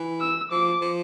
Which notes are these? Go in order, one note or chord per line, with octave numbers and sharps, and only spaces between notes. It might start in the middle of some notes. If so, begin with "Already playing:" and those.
Already playing: E3
E6
F3 D6
F3